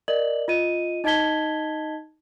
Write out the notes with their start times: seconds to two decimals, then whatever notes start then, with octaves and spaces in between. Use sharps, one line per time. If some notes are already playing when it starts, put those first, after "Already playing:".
0.08 A#4 D5 D#5 F#7
0.48 F4 D#5 D#7
1.04 D#4 D#5 A5 G#6 B6 G7